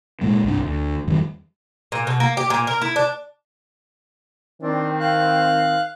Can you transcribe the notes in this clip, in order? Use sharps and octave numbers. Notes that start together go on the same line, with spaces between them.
A#2 G#3 A#3
C2 G2 D4
D2
F2 D#3 F3 G3
A#2
B2
A#3
G4
A#2
A#4
E4
D4
D#3 C4 D4
F5 F#6